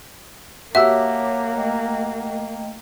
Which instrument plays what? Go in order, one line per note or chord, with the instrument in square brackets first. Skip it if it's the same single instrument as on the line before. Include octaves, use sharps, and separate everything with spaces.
[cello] A#3 [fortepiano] F#4 G4 E6 [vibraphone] C#5 A5 D6 [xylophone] E5
[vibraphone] A3 D#5 G5